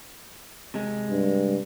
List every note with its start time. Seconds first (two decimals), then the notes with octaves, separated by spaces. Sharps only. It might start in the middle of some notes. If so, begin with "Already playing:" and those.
0.74 C3 G#3
1.10 G2